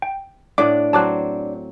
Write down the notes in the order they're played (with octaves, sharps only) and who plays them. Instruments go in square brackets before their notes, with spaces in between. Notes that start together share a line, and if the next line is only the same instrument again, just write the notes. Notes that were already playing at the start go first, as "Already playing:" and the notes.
[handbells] G5
[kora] A2 F#5 [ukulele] D4 [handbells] D6
[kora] F#3 C4 [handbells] A5 D6 F#6